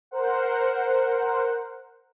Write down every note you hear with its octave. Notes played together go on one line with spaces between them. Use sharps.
A#4 C5 F#5